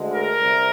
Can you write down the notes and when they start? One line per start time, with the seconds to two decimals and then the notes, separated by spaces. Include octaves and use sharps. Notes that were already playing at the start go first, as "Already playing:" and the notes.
Already playing: D2 D3 G#3
0.12 A#4
0.42 C2